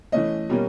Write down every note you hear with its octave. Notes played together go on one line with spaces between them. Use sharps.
E3 A3 C#4 D#5
B2 G3 A#3 C#4